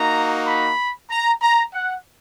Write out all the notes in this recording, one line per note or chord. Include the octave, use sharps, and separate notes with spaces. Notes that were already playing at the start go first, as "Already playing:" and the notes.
Already playing: A#3 D#4 F#4 A#5
B5
A#5
A#5
F#5